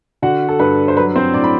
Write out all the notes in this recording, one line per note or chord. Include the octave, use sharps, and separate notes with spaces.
D3 F#4 F#5
A4
G2 B4
C5
F#3 B4
C4 C5
A2 D4 D5
B5